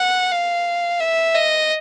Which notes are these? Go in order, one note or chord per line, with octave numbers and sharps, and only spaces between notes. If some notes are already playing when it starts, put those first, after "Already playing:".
Already playing: F#5
F5
E5
D#5